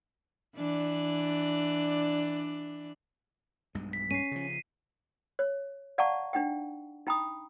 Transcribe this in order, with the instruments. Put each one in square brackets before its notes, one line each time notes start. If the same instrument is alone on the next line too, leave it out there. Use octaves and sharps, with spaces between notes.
[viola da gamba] E3 D4 D5
[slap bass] B1 G2 G#3
[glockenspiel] B6
[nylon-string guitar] C#4 [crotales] C7 D#7
[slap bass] C#3 F3
[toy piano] C#5
D5 F5 F#5 A5 A#5 C#6
D4 D#4 F#5 G5
D#4 G5 A#5 B5 D#6